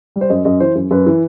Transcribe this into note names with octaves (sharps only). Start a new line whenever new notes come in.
G3
C5
F#2 D#5
F#2 D#5
E3 C5
F#2
F#2 B4
E3